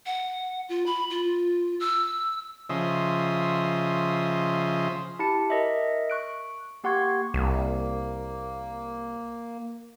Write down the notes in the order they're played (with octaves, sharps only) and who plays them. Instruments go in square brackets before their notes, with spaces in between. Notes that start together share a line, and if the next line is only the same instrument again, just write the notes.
[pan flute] F#5
F4
B5
F4
E6
[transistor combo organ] C#3 F3 D#5 E5 C6
[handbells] E4 G4 A5 C#7
A#4 D#5 E5
C#6 F#6 D7
A#3 G4 F#5 C6 C#6 G#6
[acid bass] C2 [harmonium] A#3